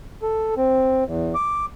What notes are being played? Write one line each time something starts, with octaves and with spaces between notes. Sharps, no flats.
A4
C4
E2
D6